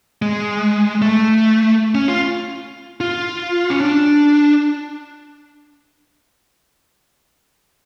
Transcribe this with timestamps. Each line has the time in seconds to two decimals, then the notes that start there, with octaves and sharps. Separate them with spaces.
0.22 G#3
1.02 A3
1.95 C#4
2.08 F4
3.01 F4
3.70 C#4
3.81 D4